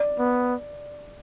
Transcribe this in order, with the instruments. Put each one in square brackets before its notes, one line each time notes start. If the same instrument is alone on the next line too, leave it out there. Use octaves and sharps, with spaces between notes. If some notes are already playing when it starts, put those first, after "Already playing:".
Already playing: [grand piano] D5
[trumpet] B3